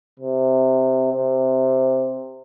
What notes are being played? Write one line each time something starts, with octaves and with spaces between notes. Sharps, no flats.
C3
C3